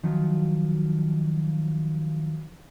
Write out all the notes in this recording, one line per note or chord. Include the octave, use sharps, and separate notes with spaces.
D#3 F3 F#3 F4